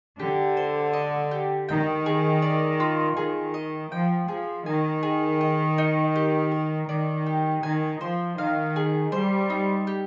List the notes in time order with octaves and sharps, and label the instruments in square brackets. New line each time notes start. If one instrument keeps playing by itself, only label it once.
[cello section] D3 [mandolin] G4
[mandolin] C5
D#5
G4
[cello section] D#3 [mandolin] G5
[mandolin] G#4
D5
F4
[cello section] D#3 [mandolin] G#4
[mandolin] D#5
[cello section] F3 [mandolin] G5
[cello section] F3 [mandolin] G#4
[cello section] D#3 [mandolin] G#5
[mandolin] G#4
D#5
D#4
G4
A#4
[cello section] D#3 [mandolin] D5
[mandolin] G4
[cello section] D#3 [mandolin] G#5
[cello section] F3 [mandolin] C5
[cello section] D#3 [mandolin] F5
[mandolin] G#4
[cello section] G3 [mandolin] C5
[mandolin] D#4
G4